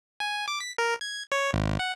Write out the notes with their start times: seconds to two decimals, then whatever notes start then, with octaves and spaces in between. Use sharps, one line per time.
0.20 G#5
0.48 D6
0.60 B6
0.78 A#4
1.01 G#6
1.32 C#5
1.53 G#1
1.79 F#5